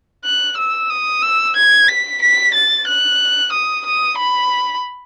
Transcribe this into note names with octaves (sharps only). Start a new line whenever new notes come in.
F#6
E6
D#6
E6
G#6
B6
B6
A6
F#6
D#6
D#6
B5